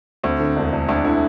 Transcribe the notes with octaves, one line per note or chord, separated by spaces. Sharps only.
D2 C4
D3 C4
E1 D4
E1
D2 D4
D3 E4